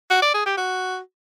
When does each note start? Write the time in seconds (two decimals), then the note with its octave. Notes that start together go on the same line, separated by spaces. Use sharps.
0.10 F#4
0.22 D5
0.34 G#4
0.46 G4
0.58 F#4